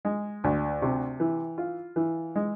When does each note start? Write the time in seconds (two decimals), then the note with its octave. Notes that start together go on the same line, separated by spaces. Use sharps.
0.05 G#3
0.44 D2
0.82 C3
1.20 E3
1.58 F4
1.96 E3
2.36 G#3